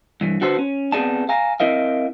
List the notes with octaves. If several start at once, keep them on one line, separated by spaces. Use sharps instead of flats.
G2 E3
D3 F#4 A4 B4 C5
C#4
B3 C4 G#4 D5 A5
F5 G#5 A#5
C4 E4 A#4 D#5 F5